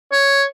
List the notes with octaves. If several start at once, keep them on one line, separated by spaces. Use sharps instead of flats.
C#5